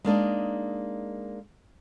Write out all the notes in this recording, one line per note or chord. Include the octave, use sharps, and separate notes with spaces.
G#3 A#3 D4 D#4